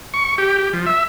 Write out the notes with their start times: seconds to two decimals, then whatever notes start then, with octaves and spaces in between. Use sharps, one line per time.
0.14 C#6
0.38 G4
0.58 G4
0.73 F3
0.86 E5